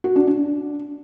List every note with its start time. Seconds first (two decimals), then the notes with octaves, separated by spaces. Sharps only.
0.04 F#4
0.16 D4
0.27 D4